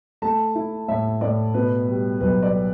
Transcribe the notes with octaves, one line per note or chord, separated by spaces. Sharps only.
A3 A5
E4
A2 E5
A2 D5
B2 B4
G3
B1 B4
D5